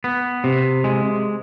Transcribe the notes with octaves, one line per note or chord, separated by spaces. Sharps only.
B3
C3
G#3